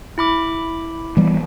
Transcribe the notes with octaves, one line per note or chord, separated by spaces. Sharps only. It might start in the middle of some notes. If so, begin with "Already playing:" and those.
E4 B5 D6
E3 G3 B3